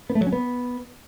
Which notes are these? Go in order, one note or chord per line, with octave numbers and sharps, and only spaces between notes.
B3
A3
F#3
C#4
B3